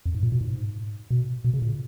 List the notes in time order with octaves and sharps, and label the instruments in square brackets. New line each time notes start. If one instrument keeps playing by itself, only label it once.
[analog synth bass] F2
G#2
A#2
B2
G#2
B2
B2
C#3
A#2